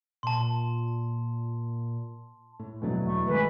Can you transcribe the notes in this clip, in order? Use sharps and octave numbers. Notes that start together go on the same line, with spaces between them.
A#2 A5 C6
A2
E1 B2 D3 E3 F#3 A3
E2 A3
G1 D#3 E3 G#3 A4 B4